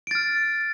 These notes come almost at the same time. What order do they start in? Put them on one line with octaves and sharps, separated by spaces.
D7 A6 F6